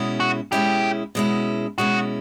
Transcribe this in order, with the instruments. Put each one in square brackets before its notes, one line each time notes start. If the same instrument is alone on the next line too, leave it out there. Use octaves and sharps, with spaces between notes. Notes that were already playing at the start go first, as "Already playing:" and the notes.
Already playing: [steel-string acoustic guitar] B2 G#3 C#4 E4
[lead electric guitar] F#4
[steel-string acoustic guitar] B2 G#3 C#4 E4 [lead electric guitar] G4
[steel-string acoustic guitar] B2 G#3 C#4 E4
[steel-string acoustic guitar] B2 G#3 C#4 E4 [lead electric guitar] F#4